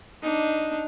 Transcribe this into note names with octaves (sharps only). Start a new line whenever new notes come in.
D4 D#4